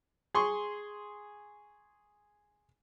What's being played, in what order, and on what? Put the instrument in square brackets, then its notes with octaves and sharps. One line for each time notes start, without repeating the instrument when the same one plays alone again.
[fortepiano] G#4 C6 C#6